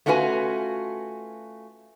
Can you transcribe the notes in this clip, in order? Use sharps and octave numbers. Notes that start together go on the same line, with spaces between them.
A3 C#4 F4 F#4 B4 G#5